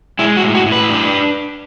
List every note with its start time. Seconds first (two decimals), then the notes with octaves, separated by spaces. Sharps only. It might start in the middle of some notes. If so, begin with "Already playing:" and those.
0.19 G#3 E4
0.37 F#4
0.43 A2
0.55 F#4
0.66 A2
0.72 B4
0.90 D4